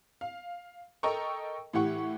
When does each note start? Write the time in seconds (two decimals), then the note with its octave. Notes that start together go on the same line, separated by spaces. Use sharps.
0.21 F5
1.03 A4 A#4 D#5 G5 A#5 C#6
1.73 A2 E3 G4 F#5 C#6